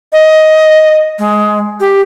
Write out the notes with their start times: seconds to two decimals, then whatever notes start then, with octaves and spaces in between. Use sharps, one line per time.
0.13 D#5
1.19 G#3
1.80 G4